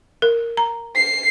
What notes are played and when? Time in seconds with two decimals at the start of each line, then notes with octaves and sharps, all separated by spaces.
0.22 A#4
0.57 A#5
0.96 C7